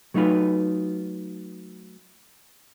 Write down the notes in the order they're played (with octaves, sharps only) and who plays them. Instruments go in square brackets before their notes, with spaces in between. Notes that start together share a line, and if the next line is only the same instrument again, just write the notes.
[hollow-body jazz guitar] F#3 A3 D#4 F4 B4